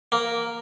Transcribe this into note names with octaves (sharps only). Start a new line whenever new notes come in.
A#3